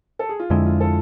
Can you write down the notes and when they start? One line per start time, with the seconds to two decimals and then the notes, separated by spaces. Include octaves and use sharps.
0.19 A4
0.29 G#4
0.39 F4
0.50 F2 D3 G#3 E4
0.66 F4
0.80 A4